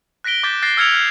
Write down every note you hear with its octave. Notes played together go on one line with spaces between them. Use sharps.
F#6 A#6 B6 D7 G7
D6 G6 A6 B6
F#6 A6 A#6 C7
E6 F6 G#6 C#7 D7 F7
F6 F#6